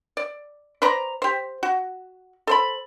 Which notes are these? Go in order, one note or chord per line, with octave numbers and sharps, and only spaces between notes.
D5
B4 C5 D5 A#5
G4 C5
F#4
A4 C5 B5